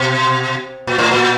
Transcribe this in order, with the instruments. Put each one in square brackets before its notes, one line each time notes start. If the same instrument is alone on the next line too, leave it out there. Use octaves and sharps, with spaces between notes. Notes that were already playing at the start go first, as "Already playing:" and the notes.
Already playing: [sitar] B2
A#2
A2
A#2